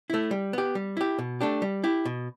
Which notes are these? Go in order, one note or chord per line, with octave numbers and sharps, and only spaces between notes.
A3 E4
G3
B3 G4
G3
E4 G4
B2
A3 D4 G4
G3
E4 G4
B2